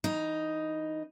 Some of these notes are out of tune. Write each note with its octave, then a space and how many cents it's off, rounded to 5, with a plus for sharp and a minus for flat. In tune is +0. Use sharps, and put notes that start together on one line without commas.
E3 -20 D#4 +0